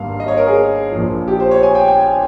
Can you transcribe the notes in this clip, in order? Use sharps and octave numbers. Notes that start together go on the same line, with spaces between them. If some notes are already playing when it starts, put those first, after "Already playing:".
Already playing: G#1 G2 G3 A#3 F5
D#5
C#5
A#4
G#4
A#1 A#2 F3
G4
C5
C#5
G#5
G5
G5
G#5